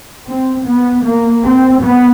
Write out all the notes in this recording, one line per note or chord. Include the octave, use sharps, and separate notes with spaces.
C4
B3
A#3
C4
B3